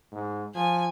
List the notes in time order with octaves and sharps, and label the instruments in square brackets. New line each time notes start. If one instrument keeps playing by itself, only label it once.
[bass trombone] G#2
[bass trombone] F3 [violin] G#5